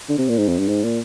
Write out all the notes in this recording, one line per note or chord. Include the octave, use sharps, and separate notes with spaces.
D3
C3
A#2
G#2
F2
G2
G#2
A#2